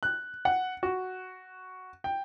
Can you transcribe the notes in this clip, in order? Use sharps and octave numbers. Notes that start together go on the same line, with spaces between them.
F#6
F#5
F#4
G5